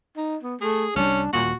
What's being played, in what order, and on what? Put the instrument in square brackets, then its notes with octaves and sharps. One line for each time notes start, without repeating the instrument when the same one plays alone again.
[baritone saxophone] D#4
B3
[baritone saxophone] A3 [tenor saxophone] G#4
[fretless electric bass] C2 G3 [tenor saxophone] C#4 [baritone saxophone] D4
[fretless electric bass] D#1 [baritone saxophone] A#2 [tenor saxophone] F#4